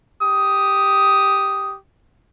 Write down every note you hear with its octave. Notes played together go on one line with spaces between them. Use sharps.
G4 D#6